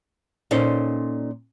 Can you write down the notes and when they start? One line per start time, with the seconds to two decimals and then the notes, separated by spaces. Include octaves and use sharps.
0.51 A#2 C#4 D#4 A4 C5